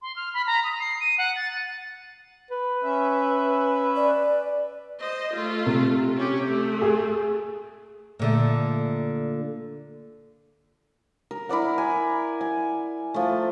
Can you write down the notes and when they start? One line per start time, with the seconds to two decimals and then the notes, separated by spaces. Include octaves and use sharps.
0.02 C6
0.16 F6
0.34 B5
0.47 A#5
0.64 D#6
0.80 C7
1.00 D#7
1.18 F#5
1.36 A6
2.51 B4
2.83 C#4 E5
3.96 D5
5.00 C5 D#5
5.33 A3 F4
5.66 C3
6.17 C#4 G4
6.48 A3
6.82 G#4
8.19 A#2 D3 A3
11.31 A#4
11.49 E4 A#4 D5 F#5
11.78 G#5
12.41 G#5
13.14 F3 A3